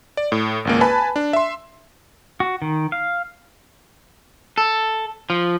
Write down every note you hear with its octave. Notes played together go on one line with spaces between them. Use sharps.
D5
A2
G#1 C#2 A#3
B4 G#5 A5 B5
D4
E5 C6
F#4
D#3
F5
A4
F3